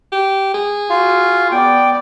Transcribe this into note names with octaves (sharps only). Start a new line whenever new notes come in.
G4
G#4
F4 F#4 F5
B3 D5 G5